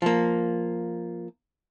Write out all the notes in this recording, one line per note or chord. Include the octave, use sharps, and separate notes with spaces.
F3 A#3